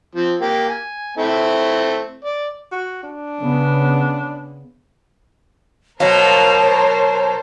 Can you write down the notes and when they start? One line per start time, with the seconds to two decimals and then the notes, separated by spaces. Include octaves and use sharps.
0.15 F3 C4
0.41 A#3 G4
0.68 G#5
1.17 A3 C4 E4
2.24 D5
2.72 F#4
3.03 D4
3.41 C#3 B3
6.00 B2 F#3 A#4 C5 C#5 F5 A5 A#5